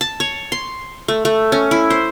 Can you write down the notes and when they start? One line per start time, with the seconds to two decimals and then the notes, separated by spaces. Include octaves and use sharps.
0.01 A5
0.20 C#5
0.52 C6
1.08 A3
1.25 A3
1.52 C#4
1.71 E4
1.90 C5